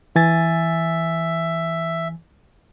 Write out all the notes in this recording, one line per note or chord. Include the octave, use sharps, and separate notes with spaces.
E3 E5 G#5 A6